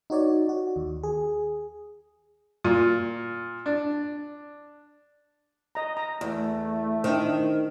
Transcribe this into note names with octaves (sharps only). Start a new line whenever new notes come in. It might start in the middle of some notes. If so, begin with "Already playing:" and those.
D#4 F#4 C#5 D5
F#4
D#2
G#4
A#2
D4
D#5 A#5
A#5
E2 A3
D#3 D4 C5